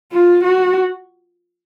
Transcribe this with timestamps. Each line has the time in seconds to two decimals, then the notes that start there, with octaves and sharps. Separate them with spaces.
0.13 F4
0.44 F#4